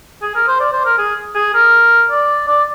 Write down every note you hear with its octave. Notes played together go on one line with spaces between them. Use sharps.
G#4
A#4
C5
D5
C5
A#4
G#4
G#4
A#4
D5
D5